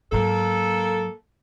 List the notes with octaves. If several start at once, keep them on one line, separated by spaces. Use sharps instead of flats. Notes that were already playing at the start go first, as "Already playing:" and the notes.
G#2 F#3 A#3 A4